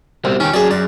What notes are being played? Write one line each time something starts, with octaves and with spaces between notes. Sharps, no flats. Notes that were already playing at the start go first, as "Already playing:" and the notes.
C2 B2 C4
D#3 C#4 G4
F#3 C#4 G#4 D5
F#2 D5